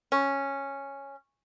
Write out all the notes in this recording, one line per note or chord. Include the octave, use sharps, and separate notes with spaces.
C#4